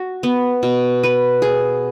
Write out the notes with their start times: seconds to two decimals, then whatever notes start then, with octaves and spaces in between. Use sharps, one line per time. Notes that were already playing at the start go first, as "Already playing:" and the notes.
Already playing: F#4
0.23 B3
0.63 B2
1.03 B4
1.42 G#4